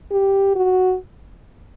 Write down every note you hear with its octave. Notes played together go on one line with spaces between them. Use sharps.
G4
F#4